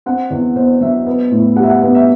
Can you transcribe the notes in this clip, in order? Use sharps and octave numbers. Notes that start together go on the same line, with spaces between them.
C4 F#5
E2
B2 C5
F#3 E5
B3
A2
G3 F#5
E5
F#5
B3 F#5
E5